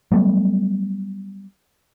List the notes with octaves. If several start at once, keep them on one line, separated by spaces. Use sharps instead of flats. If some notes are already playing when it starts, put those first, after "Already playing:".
F#3 G3 A3 B3